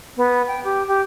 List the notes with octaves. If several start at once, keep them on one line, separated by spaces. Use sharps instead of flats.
B3
G5
G4
G4